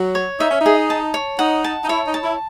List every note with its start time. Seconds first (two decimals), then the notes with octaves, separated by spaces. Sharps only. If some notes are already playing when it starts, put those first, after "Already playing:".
Already playing: F#3
0.15 C#5
0.40 D#4 E5
0.50 C#4
0.60 D#4
0.66 G#4
0.90 A5
1.14 C#5
1.39 D#4 F#5
1.64 A5
1.84 D#4
1.89 E4 C#5
2.05 D#4
2.14 A5
2.22 E4